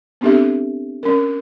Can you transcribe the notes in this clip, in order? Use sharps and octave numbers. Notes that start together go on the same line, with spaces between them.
B3 C4 D4 G4 A4 E5
C#4 A#4